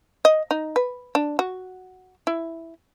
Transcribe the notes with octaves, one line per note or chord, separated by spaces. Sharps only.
D#5
D#4
B4
D4
F#4
E4